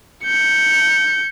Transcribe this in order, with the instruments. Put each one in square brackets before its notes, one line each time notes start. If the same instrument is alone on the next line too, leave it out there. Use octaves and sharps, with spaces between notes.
[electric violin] G6 C#7